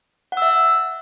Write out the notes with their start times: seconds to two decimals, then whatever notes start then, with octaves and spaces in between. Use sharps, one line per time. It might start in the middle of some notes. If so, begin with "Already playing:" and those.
0.32 F#5
0.37 E6
0.42 E5